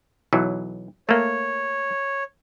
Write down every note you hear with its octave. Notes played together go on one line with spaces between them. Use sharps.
B1 E3 F#3
A3 A#3 C#5